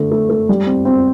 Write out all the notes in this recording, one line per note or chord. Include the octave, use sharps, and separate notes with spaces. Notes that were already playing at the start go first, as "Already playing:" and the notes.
Already playing: D3 A3
A3
A3
G3
C4
C4